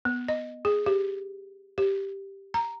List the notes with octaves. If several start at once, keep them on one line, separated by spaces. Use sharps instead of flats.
B3
D#5
G#4
G4
G4
A#5